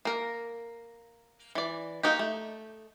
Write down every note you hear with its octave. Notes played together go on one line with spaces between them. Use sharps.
A#3 A#4
E3 D5
A#3 D#4 F#4 G4
A3